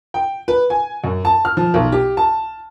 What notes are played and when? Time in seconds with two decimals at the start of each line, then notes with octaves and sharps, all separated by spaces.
0.14 G5
0.48 B4
0.70 G#5
1.04 F#2
1.25 A5
1.45 F6
1.57 F3
1.74 B1
1.92 G4
2.17 A5